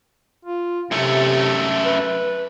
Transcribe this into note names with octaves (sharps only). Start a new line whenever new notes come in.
F4
F#2 C3 A3
B4